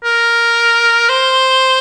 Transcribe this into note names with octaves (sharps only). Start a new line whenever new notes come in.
A#4
C5